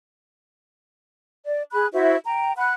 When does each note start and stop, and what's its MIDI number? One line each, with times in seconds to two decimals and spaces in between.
1.45 1.62 74
1.72 1.86 68
1.72 1.86 83
1.72 1.86 90
1.93 2.16 64
1.93 2.16 66
1.93 2.16 72
1.93 2.16 76
2.25 2.52 79
2.25 2.52 82
2.56 2.73 78
2.56 2.73 83
2.56 2.73 90